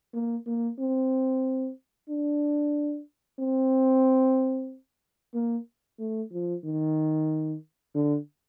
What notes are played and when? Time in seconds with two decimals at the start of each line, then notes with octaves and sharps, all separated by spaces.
0.14 A#3
0.47 A#3
0.80 C4
2.10 D4
3.40 C4
5.34 A#3
6.00 A3
6.32 F3
6.65 D#3
7.95 D3